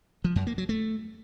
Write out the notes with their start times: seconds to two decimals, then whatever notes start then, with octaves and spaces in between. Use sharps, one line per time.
0.24 F3
0.36 F#2
0.47 A#3
0.58 F#3
0.69 A3